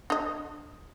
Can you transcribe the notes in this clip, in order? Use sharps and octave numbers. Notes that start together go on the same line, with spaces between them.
D4 D#5